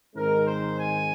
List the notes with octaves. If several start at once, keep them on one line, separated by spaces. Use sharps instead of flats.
G#2 D#3 G#3 C4 A#4
C5
G#5